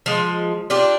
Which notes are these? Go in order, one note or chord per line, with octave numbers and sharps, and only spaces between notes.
F3 G#3
D4 F4 G4